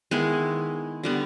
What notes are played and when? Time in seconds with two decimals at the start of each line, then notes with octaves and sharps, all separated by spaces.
0.11 D#3 G#3 B3 E4
1.04 D3 G3 B3